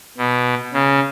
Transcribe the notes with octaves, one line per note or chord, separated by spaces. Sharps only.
B2
C#3